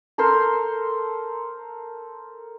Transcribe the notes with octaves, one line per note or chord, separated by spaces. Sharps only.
A4 A#4 C5 C6